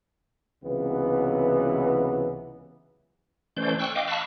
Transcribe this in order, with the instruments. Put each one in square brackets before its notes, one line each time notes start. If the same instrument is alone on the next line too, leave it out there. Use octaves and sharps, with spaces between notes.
[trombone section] C#2 C3 E3 F#3 B3
[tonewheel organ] E3 A3 C#4 C5 D5 G6
G5 C#6 E6 F#6
D#5 F5 G5 D6
F5 A5 B5 C#6 E6 F#6